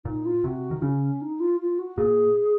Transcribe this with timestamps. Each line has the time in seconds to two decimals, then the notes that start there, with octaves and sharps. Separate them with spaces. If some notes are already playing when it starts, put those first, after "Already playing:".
0.05 A#2 D#4
0.25 F4
0.44 C3 F#4
0.71 D#3
0.82 C#3 C#4
1.21 D#4
1.40 F4
1.60 F4
1.79 F#4
1.97 A#2 G#4